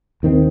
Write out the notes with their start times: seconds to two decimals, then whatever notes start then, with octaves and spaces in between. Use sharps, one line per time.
0.23 D#2 D#3 C4